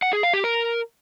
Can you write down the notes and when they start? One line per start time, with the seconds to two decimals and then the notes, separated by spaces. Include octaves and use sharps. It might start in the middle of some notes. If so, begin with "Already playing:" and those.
0.02 F#5
0.13 G#4
0.23 F5
0.34 G4
0.44 A#4